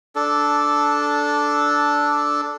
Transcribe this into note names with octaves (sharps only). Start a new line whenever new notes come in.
D4 A4